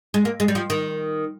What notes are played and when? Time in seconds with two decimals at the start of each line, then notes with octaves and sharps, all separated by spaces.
0.14 G#3
0.25 A#3
0.40 G#3
0.48 G3
0.55 F3
0.70 D#3